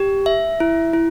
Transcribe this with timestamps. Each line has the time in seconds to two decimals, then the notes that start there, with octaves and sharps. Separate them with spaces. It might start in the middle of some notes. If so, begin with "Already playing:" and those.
Already playing: G4
0.26 E5
0.60 E4
0.94 E4